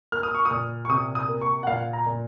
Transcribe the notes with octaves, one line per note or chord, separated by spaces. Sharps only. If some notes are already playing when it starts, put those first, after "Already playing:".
A#3 F6
D#6
C#6
D#6
A#2
C#6
C3 D#6
D#6
A#3
C#6
F#5
A#2 F5
A#5
A#2